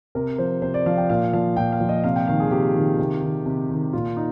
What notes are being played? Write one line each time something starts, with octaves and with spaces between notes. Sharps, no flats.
C3 A#4
F3 C5
C3 C5
D5
F3 F5
G5
A#2 F5
F3 F5
A#2 G5
F5
F3
D#5
C3 F5
G5
D#3 F5
G#4
C3 G4
D#3
C3
D#3
C3
D#3
A#2 F4
D#4